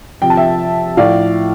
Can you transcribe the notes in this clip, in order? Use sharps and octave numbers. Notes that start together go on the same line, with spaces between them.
C3 F3 G5
A5
E5 G5
A2 F3 D5 F5